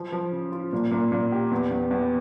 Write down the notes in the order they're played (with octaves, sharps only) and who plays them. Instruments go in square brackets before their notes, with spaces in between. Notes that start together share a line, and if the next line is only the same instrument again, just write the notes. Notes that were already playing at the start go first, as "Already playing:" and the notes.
Already playing: [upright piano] F3
F3
C#3
F4
A#2
A#2
A#2
G4
E2
E2
E2